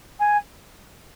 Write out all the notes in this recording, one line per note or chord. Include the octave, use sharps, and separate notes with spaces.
G#5